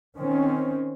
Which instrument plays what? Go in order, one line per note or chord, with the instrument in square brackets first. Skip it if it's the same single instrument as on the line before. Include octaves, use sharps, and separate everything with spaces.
[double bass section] D#3 C4 C#4